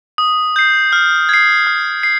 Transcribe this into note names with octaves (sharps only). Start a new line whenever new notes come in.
D#6
G6 C7
F6
G#6 C7
F6
C7